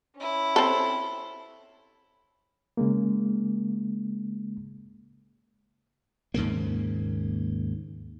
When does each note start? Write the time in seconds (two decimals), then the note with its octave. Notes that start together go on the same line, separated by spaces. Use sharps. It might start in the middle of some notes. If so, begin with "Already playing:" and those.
0.15 C#4 E4
0.56 C4 A4
2.77 C#3 G#3 A#3
6.34 D#2 G#2 C#3 A#3